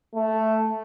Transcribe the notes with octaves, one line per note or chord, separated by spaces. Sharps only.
A3